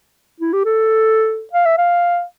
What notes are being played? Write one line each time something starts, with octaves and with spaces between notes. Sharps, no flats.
E4
G4
A4
F5
E5
F5